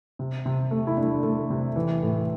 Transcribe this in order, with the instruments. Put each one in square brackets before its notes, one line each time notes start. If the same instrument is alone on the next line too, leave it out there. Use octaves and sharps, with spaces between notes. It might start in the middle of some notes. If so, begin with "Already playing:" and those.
[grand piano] C3
C3
A3
E4
A3 D4
A3
C3
E3
A2